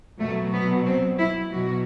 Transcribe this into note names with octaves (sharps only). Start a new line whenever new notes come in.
B2 F#3 A3
B3
C4
E4
B2 F#3 F#4